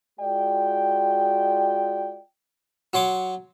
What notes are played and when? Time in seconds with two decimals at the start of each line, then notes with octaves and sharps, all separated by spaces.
0.20 G#3 F4 F#4 D5 D#5 G5
2.93 F#3 C#5 C6 D6